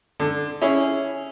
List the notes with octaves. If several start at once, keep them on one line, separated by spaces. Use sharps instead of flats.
D3
C#4 E4 G#4